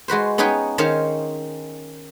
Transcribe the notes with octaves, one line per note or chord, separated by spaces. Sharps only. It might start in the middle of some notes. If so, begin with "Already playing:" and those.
G#3 F#4 B4 C5
B3 C#4 D#4 G#4 B4 G5
D#3 C#4 G#4 C5 C#5 F5